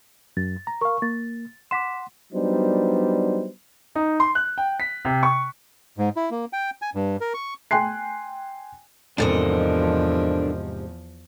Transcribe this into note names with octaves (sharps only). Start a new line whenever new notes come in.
F#2 A6
A#5
A#4 F5 C#6
A#3 A6
F#5 C6 D6 B6 E7
F#3 G3 B3 D4 D#4 C5
D#4
C6
F#6
G5
B6
C3
C#6
G#2
E4
A#3
G5
G#5
G2
A#4
C#6
G5 G#5 C6 F#6 C7
E2 G#2 C3 F3 D4 A4 A#4 D#5